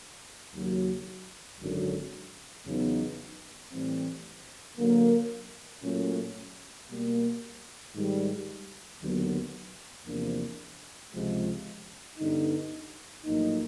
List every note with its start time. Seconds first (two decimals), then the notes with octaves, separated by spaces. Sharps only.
0.53 D#2 C#3 F#3 A#3
1.59 G#1 F#2 D3 F#3
2.65 E2 C#3 F#3 B3 D#4
3.71 A2 E3 G3 C4
4.78 D3 F#3 A#3
5.83 A#2 F#3 A3 C#4
6.89 B2 G3 A#3
7.95 G#2 D#3 G3
9.01 D#2 D3 F#3 B3
10.06 E2 C3 F3 A#3 D4
11.13 C#2 C3 F3 G#3
12.18 G2 D3 G3 B3 D#4
13.24 A#1 A2 F#3 A#3 D#4